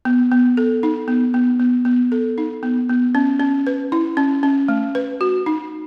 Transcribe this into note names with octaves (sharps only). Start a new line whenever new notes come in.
B3
B3
A4
D#4
B3
B3
B3
B3
A4
D#4
B3
B3
C#4
C#4
B4
E4
C#4
C#4
A3
B4
F#4
D#4